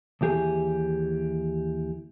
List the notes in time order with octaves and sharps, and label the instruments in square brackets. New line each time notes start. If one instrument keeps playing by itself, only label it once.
[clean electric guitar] D#2 E3 G4 G#4